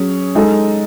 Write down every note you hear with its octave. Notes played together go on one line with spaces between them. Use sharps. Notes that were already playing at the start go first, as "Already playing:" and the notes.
Already playing: F#3 C#4 G#4 C#5
G#3 D#4 A4